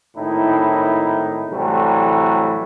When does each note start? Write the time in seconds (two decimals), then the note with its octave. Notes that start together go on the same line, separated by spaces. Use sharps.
0.16 G#1 A2 D#4 E4
1.51 A2 C3 E3 F#3 G3 A3